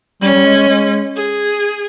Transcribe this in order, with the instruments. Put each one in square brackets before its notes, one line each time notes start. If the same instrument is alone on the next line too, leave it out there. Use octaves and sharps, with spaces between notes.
[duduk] G3 [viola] C#4
[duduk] G3
G#3
G#3
G#3
[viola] G#4